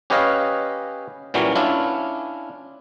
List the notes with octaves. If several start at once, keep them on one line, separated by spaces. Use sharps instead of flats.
C#4 G4 B4 C#5 D#5 F5
A#2 E3 F#3 G3 C#4
C#4 D4 E4 F4